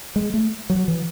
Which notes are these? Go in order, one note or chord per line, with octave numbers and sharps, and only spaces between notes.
G#3
A3
F#3
E3